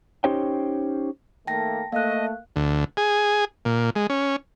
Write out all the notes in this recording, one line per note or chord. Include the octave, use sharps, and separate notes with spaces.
C#4 D#4 G4 C5 C#5 G5
D#3 A3 A#3 G5 A5 A#6
A3 A#3 D#5 F5 F#6
D2
G#4
A#2
G#3
C#4